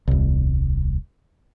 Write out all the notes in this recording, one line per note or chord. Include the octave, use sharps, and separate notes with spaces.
D#1 C2